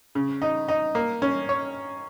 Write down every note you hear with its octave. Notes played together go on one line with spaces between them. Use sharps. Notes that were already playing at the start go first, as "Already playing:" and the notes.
C#3
D#4
D#4
A#3
C#4
C#5